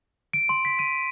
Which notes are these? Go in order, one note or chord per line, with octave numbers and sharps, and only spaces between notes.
D7
C6
B6
D#7